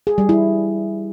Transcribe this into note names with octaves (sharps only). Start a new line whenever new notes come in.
G#4
G3
E4